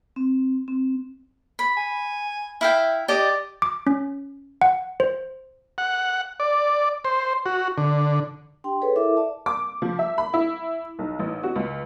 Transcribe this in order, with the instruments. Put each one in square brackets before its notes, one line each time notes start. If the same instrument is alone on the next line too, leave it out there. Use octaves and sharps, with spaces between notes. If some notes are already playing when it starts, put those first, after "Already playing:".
[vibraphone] C4
C4
[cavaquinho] B5
[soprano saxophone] G#5
[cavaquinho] E4 F5 G5 [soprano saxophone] E5
[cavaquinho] G4 D#5 [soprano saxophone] D5
[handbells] D6
C#4
F#5
C5
[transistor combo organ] F#5
D5
C5
F#4
D3
[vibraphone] D4 G4 G5 C6
G#4 A4 B4 C#5
E4 A4 A#4 E5 D6
D5 E5 A5
[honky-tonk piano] D6
F3
E5
B5
E4
B1
A1
F#4
C#2